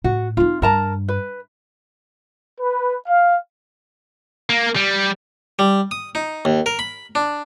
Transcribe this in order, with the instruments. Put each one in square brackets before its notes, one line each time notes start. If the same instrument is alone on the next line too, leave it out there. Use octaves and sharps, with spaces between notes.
[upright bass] A2 [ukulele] F#4
[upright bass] C4 D#4 [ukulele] F4
[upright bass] G2 [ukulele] A#4 A5 A#5
[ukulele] B4
[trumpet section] B4
F5
[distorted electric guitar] A#3
G3
[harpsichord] G3
D#6
D#4
D#2
A#4
B5
D4